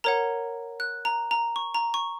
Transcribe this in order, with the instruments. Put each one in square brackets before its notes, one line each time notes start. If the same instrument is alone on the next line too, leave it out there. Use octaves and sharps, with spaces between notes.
[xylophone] A#4 C#5 F#5 A#5
F#6
A#5
A#5
C#6
A#5
C#6